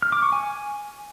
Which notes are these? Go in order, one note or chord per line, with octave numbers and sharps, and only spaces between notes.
F6
D6
C#6
G#5